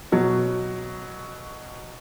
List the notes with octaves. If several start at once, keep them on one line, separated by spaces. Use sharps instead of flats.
B2 F#3